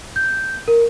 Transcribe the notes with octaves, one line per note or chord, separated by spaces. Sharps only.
G6
A#4